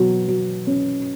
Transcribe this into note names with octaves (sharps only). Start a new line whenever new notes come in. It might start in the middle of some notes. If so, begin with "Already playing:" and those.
Already playing: B2 F#3
F#3
C#4